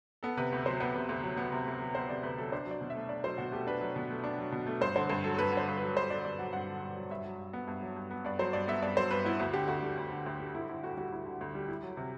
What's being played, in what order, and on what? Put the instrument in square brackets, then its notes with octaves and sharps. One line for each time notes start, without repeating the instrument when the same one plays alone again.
[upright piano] B3 A4
C3 B4
D2
F#3 C5
B3 B4
C3
D2
F#3
B3
C3
D2
F#3
B3 C5
C3 D5
D2 B4
F#3 A4
D4 C5
F#3
D5
B2
E5
A3
D4 D5
F#3 C5
B2 F#4
A3 G4
D4 B4
F#3
B2
A3
D4
F#3
B2
A3
G2 C5
D3 C5
G2 C5
F#3 A4
A4
G2 B4
D3 C5
G2
B4
F#3
G2 C5
D3 D5
G2 D5
F#3 F#5
G2 F#5
D3
G2
F#3
G2 E5
F#3
G2
B3
G2
F#3
G2
B3
G2 D5
F#3 C5
G2 D5
B3 E5
G2 D5
F#3 C5
G2 B4
B3 E4
D2 F#4
D3 G4
D2 F#4
G3
D2
D3
D2
G3
D2 E4
D3 E4
D2 F#4
G3 F#4
D2 E4
D3
D2
G3
E4
F#3
C3